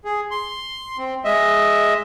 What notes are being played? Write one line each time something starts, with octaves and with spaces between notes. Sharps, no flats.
G#4
C6
C4
G#3 D#5 E5